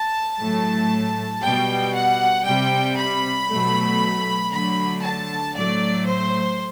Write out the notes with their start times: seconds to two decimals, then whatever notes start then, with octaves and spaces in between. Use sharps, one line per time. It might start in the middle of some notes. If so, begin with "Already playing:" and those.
Already playing: A5
0.39 A2 F#3 A3
1.43 B2 G3 G5
1.94 F#5
2.46 C3 G3 G5
2.97 B5
3.49 B2 F#3 A3
4.52 D3 F#3 A3 B5
5.03 A5
5.55 A2 F#3 A3 D5
6.06 C5